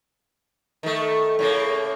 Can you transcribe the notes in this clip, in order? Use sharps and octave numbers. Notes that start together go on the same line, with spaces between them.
D#3 A3
A2 C#3 A#3